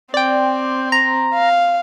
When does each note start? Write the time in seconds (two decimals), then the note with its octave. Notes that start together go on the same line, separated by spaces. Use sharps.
0.14 C4 D5 G5
0.92 A#5
1.34 F5